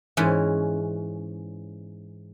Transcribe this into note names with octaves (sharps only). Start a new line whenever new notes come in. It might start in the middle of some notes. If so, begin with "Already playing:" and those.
G#2 E3 C#4